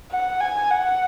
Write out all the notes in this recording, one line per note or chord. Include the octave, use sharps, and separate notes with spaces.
F#5
G#5
F#5